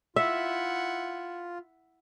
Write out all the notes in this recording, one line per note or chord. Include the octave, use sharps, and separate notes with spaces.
E4 F4 E5 F#5